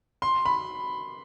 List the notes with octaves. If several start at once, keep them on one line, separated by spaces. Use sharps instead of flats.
C6
B5